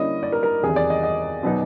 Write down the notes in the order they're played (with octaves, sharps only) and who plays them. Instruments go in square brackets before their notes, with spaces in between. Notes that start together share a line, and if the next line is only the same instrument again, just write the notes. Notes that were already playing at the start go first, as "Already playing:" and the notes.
Already playing: [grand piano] D3 G3 A#3 C#4 E4 [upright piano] D#5
[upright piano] D5
A#4
A#4
[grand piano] E2 C3 D#3 [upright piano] G#4
[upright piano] D5
D#5
D#5
[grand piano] B2 F#3 B3 D#4